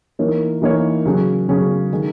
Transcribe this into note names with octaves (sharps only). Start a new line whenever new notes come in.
E3 A#3 D#4 A#4 C#5
E3 A#3 D#4 A#4 C#5
C#3 F#3 C#4 G#4
C#3 F#3 C#4 G#4
D#3 G#3